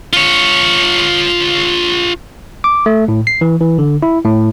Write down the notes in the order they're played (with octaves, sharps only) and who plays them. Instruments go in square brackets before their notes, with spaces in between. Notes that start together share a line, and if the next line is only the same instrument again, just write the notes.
[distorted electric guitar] F4 C#5
[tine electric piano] D6
A3
A2
C7
E3
E3
D3
E4
A2